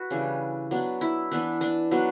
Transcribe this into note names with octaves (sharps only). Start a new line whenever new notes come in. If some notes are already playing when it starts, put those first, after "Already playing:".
Already playing: F#4 B4
C#3 E3 G3 D4
F#3 B3 D4
E4
E3 B3 D4
D4
F#3 B3 D4